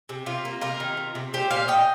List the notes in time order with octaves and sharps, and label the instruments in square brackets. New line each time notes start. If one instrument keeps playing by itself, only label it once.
[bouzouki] C3
C3 F4
A#3
C3 F4 A#4
D#3
C3
C3
A#2 G4 C5
A#2 C5 F5
A#2 D#5 G5